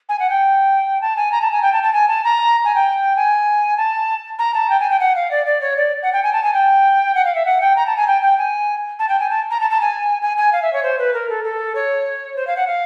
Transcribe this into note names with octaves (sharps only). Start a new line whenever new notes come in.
G#5
F#5
G5
A5
G#5
A#5
A5
G#5
G5
A5
A5
G#5
A5
A#5
G#5
G5
G#5
A5
A#5
A5
G5
G#5
G5
F#5
F5
D5
D5
C#5
D5
F#5
G5
G#5
A5
G#5
G5
F#5
F5
E5
F#5
G5
A#5
A5
G#5
G5
G5
G#5
A5
G5
G#5
A5
A#5
A5
A5
G#5
G#5
G#5
F5
E5
C#5
C5
B4
A#4
A4
A4
C#5
C5
F5
F#5
F5